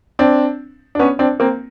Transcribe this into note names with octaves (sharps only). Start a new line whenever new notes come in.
C4 D4
D4
B3 C#4
C4 D4
A#3 C4